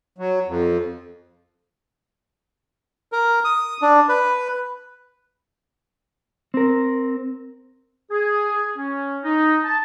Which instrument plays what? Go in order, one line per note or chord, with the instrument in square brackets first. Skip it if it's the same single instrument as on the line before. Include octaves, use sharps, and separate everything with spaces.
[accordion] F#3
F2
[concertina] A#4
D#6
D4
B4
[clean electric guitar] C4 A#4
[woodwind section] G#4
C#4
D#4
A5